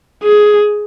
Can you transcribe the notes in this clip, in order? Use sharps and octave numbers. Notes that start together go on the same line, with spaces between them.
G#4